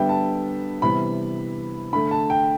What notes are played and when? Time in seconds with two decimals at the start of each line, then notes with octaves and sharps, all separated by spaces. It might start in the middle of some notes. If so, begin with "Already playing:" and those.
Already playing: D3 G3 B3 E5 G5
0.09 A5
0.82 C3 E3 G3 B3 B5
1.92 D3 A3 B5
2.11 A5
2.30 G5